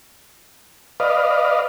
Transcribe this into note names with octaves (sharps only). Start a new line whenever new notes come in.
B4 D5 D#5 F5